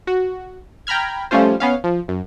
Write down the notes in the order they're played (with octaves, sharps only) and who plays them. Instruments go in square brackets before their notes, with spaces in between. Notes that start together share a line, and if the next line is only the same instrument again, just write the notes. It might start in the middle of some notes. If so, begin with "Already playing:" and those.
[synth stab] F#4
G5 A#5 B5 F6 G#6
F3 G3 A3 C#4 F4 C5
B3 C#4 F5
F3
F#2